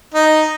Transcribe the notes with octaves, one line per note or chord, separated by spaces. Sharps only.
D#4